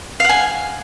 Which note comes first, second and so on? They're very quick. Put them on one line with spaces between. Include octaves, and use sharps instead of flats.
F5 F#5 G#5